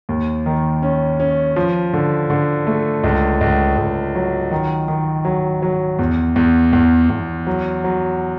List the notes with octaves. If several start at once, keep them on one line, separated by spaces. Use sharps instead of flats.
D#2
D#3
C#4
C#4
F3
D3
D3
A3
C#2
C#2
C#2
F#3
D#3
D#3
F#3
F#3
E2
E2
E2
E2
F#3
F#3